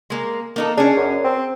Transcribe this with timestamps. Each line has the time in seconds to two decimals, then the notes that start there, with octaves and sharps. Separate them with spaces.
0.10 G#3 A#3
0.56 A#3 D#4 A4
0.78 C#4 D4 G#4
0.97 F#2
1.24 C4